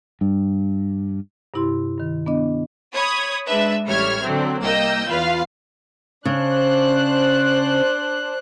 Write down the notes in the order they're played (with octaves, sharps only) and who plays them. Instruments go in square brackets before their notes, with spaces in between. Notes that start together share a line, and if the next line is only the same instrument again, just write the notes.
[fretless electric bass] G2
[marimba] G2 C3 E4 G4 C6
G2 D#3
B3 D4 D#5
[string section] C#5 B5 D#6 G#6
G#3 D4 B4 E5
A1 G3 C#5 E5 F6 G#6
D3 F#3 C4
C2 A#3 D#5 G5 E6 G6
E2 F4 B4 F5
[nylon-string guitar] C#3 [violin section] D4 C5 F#6